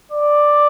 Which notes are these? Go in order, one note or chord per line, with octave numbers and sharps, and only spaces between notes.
D5